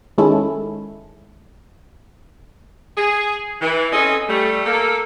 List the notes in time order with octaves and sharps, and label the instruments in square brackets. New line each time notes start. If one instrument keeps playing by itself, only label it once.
[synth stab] D#3 G#3 C#4 E4 A4
[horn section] G#4
E3
C4 C#4 G#4 A4 D#5
G3 A3
A#3 A4